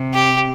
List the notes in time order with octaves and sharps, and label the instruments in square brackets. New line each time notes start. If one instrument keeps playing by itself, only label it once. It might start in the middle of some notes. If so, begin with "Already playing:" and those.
Already playing: [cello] C3
[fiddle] G4